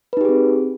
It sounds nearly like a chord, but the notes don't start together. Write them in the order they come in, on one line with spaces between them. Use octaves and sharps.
B4 D#4 G4 G#4 C4